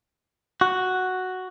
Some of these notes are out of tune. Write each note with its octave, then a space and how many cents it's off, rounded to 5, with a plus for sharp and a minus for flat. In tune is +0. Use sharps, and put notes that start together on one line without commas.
F#4 +0